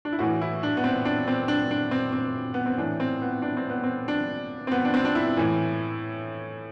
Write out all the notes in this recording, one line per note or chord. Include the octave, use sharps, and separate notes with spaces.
D4
E4
A2 E3 F#4
E4
D4
B3
C4
D4
C4
D4
D4
C4
C4
B3
C4
A2 E3 D4
C4
B3
D4
C4
B3
C4
D4
C4
B3
D4
C4
D4
E4
A2 E3